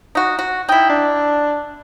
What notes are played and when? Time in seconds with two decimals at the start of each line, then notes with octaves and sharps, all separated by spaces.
0.15 D#4 F#4
0.39 F#4
0.69 D#4 E4 G5
0.89 D4